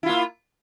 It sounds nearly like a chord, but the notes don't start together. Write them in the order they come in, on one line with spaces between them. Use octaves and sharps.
E4 F4 A#3